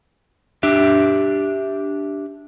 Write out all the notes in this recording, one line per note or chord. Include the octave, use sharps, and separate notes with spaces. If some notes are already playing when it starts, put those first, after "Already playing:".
D4 G4 E5